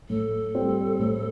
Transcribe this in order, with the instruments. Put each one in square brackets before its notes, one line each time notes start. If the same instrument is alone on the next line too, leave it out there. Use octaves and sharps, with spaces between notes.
[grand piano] A2 [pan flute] A4
[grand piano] G3 C4
A2